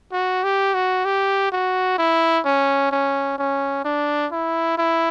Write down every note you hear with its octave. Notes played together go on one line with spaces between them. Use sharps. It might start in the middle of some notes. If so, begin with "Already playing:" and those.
F#4
G4
F#4
G4
F#4
E4
C#4
C#4
C#4
D4
E4
E4